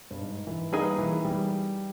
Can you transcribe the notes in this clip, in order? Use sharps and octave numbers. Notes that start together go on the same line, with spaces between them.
G2
G#2
E3
G3 A#3 D#4 G#4 B4
E3
G3